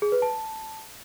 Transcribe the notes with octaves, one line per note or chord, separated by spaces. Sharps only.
G#4
B4
A5